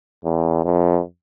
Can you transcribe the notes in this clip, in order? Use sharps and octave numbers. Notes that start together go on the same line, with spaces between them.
E2
F2